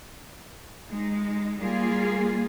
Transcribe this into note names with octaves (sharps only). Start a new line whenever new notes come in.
G#3 D#4
G3 A#3 F4 G#4